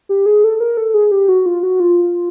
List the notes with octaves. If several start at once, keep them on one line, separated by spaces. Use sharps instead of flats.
G4
G#4
A4
A#4
A4
G#4
G4
F#4
F4
F#4
F4